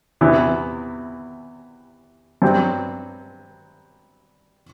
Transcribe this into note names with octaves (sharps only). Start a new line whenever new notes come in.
E2 C3 E3 B3 E4
G2 F#3 C4 G4